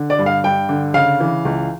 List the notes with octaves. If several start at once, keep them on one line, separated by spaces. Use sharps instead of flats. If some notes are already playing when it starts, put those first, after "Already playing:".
Already playing: D3
D5
G2
F5
G2 G5
D3
C#3 F5
E3
C#2